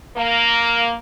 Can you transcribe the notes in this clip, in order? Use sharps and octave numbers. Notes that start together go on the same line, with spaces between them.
A#3